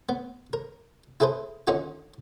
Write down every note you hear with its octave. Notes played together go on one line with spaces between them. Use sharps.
B3
A#4
E4 G#4 A4 B4 C5
D3 D#3 C#4 D#4 F4 F#4